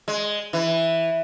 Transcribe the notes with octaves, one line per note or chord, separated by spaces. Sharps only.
G#3
E3